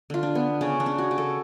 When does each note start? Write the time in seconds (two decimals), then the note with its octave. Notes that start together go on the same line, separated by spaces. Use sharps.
0.10 D3 F4
0.23 D4
0.35 B3
0.61 C#3 C#4
0.80 D4
0.86 C#4
0.98 F#4
1.11 C#3
1.18 A4